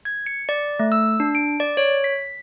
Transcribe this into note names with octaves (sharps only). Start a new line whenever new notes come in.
G#6
C#7
D5
A3
E6
D4
D7
D5
C#5
B6